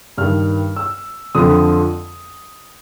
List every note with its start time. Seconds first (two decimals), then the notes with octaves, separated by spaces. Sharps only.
0.17 G2 D#3 F6
0.76 E6
1.35 F2 D3 F3 D#6